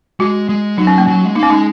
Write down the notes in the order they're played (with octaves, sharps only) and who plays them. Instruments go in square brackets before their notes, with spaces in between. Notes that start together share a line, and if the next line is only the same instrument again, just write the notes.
[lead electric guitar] G#3 [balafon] F#4
[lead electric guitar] G#3
[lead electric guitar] F#3 [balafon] D#4
[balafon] C#4
A#3
[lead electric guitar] F#3 [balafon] C#4
[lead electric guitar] G#3
[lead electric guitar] A#3 [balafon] D#4
[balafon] C#4
[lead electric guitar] G#3 [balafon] D#4